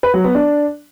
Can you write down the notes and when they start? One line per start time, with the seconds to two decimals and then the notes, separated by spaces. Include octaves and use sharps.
0.03 B4
0.14 F#3
0.24 B3
0.35 D4